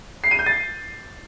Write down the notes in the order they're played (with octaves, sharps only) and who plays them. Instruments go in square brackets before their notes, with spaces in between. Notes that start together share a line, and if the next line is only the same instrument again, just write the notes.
[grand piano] C7
D#7
G6
A6